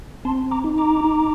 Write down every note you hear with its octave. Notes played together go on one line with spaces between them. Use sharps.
C4 A5 C6
A#5 D6
D#4
A#5 D6
D#4